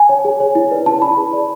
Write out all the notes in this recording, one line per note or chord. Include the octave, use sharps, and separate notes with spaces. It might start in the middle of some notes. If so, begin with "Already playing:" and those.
Already playing: G#5
C#5
G#4
C#5
E4
B4 D5
E4 A5
B4 D5 B5
G#4
B4 D5